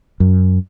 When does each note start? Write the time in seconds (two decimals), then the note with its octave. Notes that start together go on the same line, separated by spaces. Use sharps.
0.20 F#2